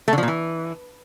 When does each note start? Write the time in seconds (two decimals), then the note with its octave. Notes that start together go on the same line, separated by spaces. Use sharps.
0.08 A3
0.13 D3
0.18 F3
0.23 A#2
0.28 E3